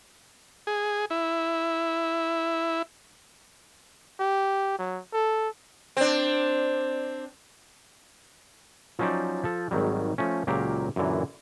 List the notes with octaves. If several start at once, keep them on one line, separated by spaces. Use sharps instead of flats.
G#4
E4
G4
F#3
A4
C4 D4
F3 F#3 C#4 D#4 C5 D5
F3 A4
G#1 D#3 F#3 G3
F3 A3 C#4
C#2 A#2 F#3 G4 A#4 F5
F#2 A#2 D3 E3